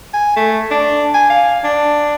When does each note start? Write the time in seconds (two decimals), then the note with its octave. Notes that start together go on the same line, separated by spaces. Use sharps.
0.14 G#5
0.36 A3
0.71 D4
1.14 G#5
1.30 F5
1.64 D4